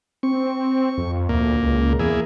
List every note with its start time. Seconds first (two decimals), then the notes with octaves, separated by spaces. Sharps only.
0.23 C4 C#6
0.98 F2
1.29 D2 A#2 A#3
1.63 C#2
1.99 E2 A#3 E4 G#4